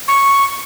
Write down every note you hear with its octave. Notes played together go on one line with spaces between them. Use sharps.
C#6